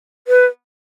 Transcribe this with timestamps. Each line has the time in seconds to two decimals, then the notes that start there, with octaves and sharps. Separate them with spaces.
0.28 B4